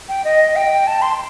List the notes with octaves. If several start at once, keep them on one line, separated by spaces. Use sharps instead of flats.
G5
D#5
G5
A5
C6